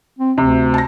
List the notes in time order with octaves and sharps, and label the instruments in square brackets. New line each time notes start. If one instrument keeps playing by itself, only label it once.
[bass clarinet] C4
[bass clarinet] D2 [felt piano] C3
[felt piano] A5 A#6